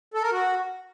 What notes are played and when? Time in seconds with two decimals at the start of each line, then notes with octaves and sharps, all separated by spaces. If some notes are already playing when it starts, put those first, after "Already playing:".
0.14 A4
0.23 A#4
0.32 F#4